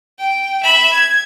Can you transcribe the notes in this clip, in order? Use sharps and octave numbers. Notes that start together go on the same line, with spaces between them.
G5
E5 B5
G#6